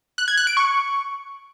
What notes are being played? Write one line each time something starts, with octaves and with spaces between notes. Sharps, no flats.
F#6
G#6
F#6
D7
C#6